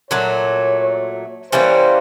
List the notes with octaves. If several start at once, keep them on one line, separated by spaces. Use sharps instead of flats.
A#2 F#3 A3 C#5
E3 G3 A#3 C#4 C5